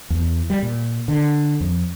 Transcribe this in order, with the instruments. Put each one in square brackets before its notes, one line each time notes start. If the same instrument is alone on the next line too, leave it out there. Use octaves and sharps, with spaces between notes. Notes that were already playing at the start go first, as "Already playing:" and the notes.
[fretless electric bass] E2
G3
A#2
D3
F2